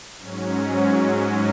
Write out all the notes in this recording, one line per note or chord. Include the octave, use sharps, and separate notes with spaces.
G#2 F#3 C#4